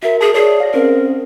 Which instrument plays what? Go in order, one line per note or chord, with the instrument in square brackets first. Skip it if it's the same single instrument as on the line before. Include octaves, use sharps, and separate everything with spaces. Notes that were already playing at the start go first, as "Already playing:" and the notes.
[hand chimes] F#4 A#4 [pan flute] E5
[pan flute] G#4 [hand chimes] A5
[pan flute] G#4 [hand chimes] C#5 D5
[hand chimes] F5 A#6
[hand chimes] C4 C#4 C5 [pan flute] A#4